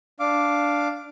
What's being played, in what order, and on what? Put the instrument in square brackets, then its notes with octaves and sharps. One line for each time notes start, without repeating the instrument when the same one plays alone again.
[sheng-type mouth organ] D4 F5 D6